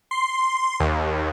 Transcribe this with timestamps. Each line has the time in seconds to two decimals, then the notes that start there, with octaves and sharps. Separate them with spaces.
0.11 C6
0.80 D#2